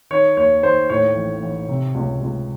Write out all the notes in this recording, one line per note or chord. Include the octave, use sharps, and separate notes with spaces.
D#3 C#5
D#2 C#5
D#2 C5
A2 C#5
A1
A1
C3
C#2
C#2